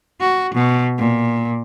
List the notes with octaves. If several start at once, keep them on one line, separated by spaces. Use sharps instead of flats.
F#4
B2
A#2